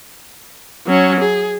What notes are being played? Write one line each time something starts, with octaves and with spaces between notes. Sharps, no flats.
F#3 C#4
G#4